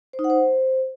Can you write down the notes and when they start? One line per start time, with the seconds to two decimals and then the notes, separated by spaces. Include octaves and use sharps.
0.13 C5
0.19 D#4
0.24 F#5
0.30 C5